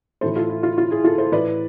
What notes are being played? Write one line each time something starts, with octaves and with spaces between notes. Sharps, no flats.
A2 E3 A4 C5
F4 A4
E4
F4
F4
E4 G#4
F4 A4
A4 C5
A2 E3 B4 D5